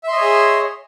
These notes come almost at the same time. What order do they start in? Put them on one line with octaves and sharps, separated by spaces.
E5 C6 D#5 C#5 G#4